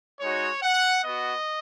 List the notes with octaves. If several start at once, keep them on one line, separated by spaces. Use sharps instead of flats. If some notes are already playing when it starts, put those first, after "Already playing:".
G#3 D#4 F#4 C#5
F#5
B3 F#4 D#5